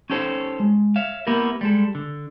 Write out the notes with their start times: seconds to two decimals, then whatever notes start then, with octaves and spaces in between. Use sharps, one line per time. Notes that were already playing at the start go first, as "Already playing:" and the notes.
0.10 C#4 D#4 G4 A4 C5 C#5
0.60 G#3
0.96 C#5 E5 F5
1.27 A#3 B3 E4 G4 A#4
1.61 G3 G#3 A4
1.95 D3